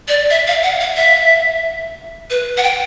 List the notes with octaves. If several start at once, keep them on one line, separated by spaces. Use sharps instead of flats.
D5
E5
F5
F#5
F5
E5
B4
F#5
G5